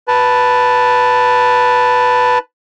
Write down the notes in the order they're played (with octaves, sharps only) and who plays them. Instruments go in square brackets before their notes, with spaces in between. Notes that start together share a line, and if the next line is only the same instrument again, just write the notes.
[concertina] B4 A5